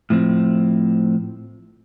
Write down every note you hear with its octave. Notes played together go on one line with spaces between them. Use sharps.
A2 F3 C4